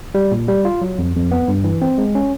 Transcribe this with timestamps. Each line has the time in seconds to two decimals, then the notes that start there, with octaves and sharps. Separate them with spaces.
0.15 G3
0.31 A#2
0.48 G3
0.65 F4
0.81 F#3
0.99 F2
1.15 F2
1.31 B3
1.48 G2
1.64 E3
1.82 C4
1.98 G#3
2.15 C#4